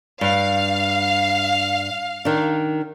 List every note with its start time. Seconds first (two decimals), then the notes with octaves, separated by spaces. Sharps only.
0.21 G2 F5
2.25 D#3 D4